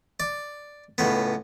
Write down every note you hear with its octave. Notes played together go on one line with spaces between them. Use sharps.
D5
C#2 A2 B3